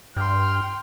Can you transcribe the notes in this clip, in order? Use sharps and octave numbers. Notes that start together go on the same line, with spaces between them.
G2 G5 C6 F6